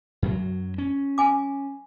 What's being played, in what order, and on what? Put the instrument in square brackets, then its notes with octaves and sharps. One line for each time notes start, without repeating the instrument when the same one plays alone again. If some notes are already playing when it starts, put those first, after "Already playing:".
[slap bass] F#2 F#3
C#4
[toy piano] G#5 D6